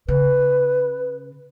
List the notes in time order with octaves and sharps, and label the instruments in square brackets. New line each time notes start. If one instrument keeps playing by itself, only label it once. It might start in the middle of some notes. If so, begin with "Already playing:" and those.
[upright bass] C#3 [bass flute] B4